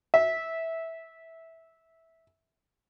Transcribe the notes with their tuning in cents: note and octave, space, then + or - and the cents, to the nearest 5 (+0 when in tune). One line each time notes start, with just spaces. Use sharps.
E5 -10